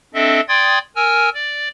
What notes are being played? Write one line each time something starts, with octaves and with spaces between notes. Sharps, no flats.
C4 D4 A4 D#5 E5
D5 G5 C6 D#6 G#6 A6
A#4 G#5 E6 F6
D5